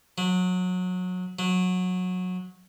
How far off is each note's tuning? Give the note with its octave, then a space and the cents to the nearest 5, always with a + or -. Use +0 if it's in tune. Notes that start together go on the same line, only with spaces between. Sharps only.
F#3 -25
F#3 -20